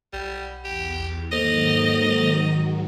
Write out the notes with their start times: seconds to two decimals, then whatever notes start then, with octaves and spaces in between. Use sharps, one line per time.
0.13 B1 G3
0.65 E2 G4
1.32 G#2 D#3 F#3 A#3 A4 C5 D#5